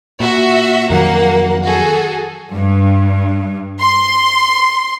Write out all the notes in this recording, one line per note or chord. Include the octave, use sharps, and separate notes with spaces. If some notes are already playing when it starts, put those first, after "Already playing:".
A#2 F#4 E5
F2 D#3 F#3 A#3 F#5
F#4 G#4 A4
G2
C6